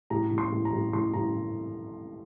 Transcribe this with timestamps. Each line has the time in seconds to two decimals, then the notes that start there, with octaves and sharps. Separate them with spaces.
0.10 A2 A#5
0.31 A2
0.38 C6
0.52 A2
0.65 A#5
0.73 A2
0.93 A2 C6
1.13 A2 A#5